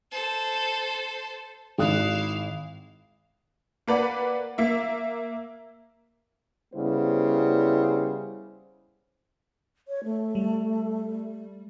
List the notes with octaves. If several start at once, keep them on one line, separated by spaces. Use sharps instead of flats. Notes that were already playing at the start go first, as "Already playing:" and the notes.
A4 C5
G#1 E4 F5 D#6 F#6
A#3 B4 D5 F#5
A#3 E5
C#3 G3 B3 E4 C5
C#5
A3
G3